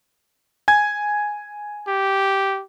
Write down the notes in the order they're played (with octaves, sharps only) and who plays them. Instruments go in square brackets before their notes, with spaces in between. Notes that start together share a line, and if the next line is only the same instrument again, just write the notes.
[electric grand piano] G#5 G#6
[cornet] G4